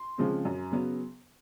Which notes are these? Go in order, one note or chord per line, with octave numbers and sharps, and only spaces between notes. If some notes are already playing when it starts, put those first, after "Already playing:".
Already playing: C6
C#3 F3 G#3 C4
F#2
C#3 F#3 B3